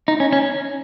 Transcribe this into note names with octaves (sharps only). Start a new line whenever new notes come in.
D#4
C#4
C#4